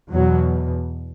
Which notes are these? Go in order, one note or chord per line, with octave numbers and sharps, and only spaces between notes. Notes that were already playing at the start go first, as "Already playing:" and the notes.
E2 B2 F#3